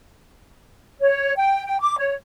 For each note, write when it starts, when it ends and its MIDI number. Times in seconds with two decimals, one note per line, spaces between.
1.01 1.34 73
1.36 1.66 79
1.66 1.78 79
1.81 1.96 86
1.99 2.14 73